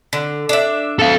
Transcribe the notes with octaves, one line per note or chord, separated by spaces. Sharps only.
D3
D4 E5
A4 F5